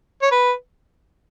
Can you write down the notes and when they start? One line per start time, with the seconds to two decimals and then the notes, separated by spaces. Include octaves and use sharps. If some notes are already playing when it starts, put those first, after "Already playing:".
0.22 C#5
0.32 B4